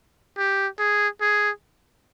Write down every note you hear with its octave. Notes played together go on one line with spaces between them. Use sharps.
G4
G#4
G#4